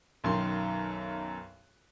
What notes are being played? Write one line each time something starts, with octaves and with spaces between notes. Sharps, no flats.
B1 F#2 D#3 C6